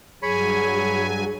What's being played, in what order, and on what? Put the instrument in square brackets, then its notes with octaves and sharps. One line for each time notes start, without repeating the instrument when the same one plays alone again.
[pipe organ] G2 F#3 G#5 [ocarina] G#4 [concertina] C#5 B5